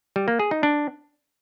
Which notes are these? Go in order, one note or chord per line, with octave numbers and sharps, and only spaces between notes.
G3
A#3
G#4
D#4
D4